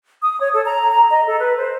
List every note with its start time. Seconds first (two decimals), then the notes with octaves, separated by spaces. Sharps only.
0.23 D#6
0.41 C#5
0.53 A4
0.66 A#5
0.90 A#5
1.10 D#5
1.27 A4
1.39 B4
1.59 C5